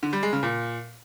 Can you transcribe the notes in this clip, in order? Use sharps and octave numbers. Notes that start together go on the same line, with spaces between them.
D3
G3
G#3
C#3
A#2